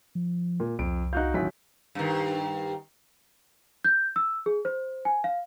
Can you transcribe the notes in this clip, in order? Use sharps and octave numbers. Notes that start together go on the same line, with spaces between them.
F3
A#2
C2 F2 D7
D#4 F#4 F5 F#6 G6
A1 D#2 F#3 B6
G2 D#3
G6
E6
G#4
C5
G#5
F5